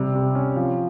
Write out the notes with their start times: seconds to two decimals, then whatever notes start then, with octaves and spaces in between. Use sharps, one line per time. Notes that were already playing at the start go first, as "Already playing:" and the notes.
Already playing: C3 G3
0.15 C3
0.35 C#4
0.56 F3